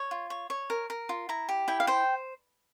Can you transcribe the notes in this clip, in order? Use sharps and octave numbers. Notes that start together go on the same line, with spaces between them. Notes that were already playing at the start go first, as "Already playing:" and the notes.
Already playing: C#5
F4
C#5
C#5
A#4
A#4
F4
E4 A#5
G4
E4 G5
F5
C5 G5